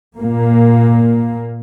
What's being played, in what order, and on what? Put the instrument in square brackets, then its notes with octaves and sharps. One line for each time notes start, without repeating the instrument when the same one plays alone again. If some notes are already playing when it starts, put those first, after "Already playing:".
[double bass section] A#2 A#3